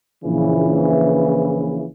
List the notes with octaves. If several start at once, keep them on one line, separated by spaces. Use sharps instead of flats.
A#1 C#3 E3